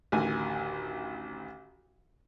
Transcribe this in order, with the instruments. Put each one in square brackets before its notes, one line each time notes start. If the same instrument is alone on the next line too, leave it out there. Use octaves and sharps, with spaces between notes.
[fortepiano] A1 D2 D#3 G#5